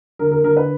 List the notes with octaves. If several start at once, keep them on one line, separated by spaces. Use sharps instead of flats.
D3 A#4
A#4
D3 A#4
B4